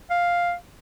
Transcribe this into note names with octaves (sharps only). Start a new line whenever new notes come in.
F5